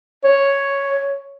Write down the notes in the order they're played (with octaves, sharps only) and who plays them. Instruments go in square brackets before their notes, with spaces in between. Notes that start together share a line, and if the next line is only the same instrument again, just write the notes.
[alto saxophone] C#5